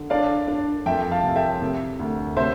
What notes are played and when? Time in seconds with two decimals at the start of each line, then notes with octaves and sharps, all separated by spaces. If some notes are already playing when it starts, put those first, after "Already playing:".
Already playing: D3
0.10 D4 D5 F5
0.48 D4
0.86 F2 E5 G5
1.11 F5 A5
1.24 C3
1.36 E5 G5
1.62 C3
1.99 D2
2.37 C3 C5 E5